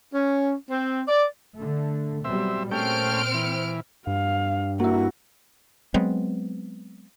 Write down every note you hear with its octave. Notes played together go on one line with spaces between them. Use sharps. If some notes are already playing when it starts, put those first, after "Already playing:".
C#4
C4
D5
D3 A3
B2 F#3 G3 C4 E5
A#2 A3 C4 C#4 G5 F6 D7
E3
G2 F5
A#3 E4 F#4
F#3 G#3 B3 C4